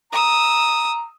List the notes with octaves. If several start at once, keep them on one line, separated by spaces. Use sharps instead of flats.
A#5 D#6 E6